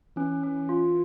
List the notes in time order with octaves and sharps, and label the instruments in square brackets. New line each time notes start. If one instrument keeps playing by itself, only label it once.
[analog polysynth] E3 [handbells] C#4
[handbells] C#4
F4